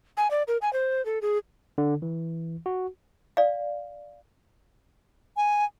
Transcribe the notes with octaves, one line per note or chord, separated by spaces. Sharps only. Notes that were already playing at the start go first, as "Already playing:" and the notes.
G#5
D5
A#4
G#5
C5
A4
G#4
D3
E3
F#4
D5 F5
G#5